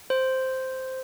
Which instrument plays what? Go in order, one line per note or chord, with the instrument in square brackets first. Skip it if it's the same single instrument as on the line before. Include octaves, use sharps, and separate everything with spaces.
[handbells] C5